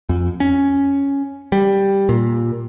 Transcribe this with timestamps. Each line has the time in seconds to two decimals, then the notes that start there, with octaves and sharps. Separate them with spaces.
0.09 F2
0.40 C#4
1.52 G3
2.09 A#2